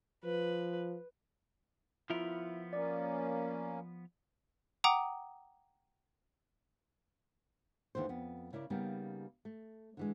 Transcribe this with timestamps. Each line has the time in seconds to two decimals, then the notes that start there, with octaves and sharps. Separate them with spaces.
0.24 F3 B4
2.10 F3 B3 E4 F4 A#4 E5
2.73 A#3 C#4 D5
4.84 F#5 G5 A#5 D6 D#6
7.95 D#2 D3 E3 C5
8.09 F2 B3
8.53 C#3 E4 A#4 D5
8.70 C#3 G3 A#3 B3 D#4
9.45 A3
9.97 D3 E3 G#3